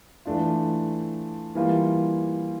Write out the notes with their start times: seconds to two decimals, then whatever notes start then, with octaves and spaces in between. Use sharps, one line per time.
0.26 E3 A3 D4 F4
1.55 E3 G3 A#3 F4